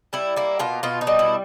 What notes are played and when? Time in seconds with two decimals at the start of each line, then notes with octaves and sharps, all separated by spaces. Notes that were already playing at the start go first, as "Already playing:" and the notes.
0.13 G3 E4
0.36 A#3 E4
0.59 B2 F4
0.83 B2 F4
1.01 D#4
1.07 G3
1.19 E4